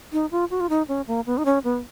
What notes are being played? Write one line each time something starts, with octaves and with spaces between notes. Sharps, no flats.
D#4
F4
F#4
F4
D#4
C#4
A#3
B3
D#4
C#4
B3